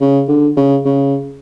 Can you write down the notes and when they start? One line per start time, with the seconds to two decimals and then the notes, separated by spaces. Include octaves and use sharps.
0.01 C#3
0.28 D3
0.57 C#3
0.85 C#3